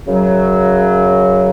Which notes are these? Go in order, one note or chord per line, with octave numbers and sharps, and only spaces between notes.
F#2 C#3 F#3